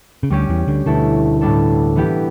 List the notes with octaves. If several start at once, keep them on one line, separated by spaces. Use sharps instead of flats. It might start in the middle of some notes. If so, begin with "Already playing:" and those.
C#3
D2 D3 G3 C#4 G4
E2 E3
D2 D3
D2 B2 D3 A3 E4 A4
A2 G3 B3 D4 A4
E3 B3 E4 G4